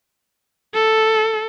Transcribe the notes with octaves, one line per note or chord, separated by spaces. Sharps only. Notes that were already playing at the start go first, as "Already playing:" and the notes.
A4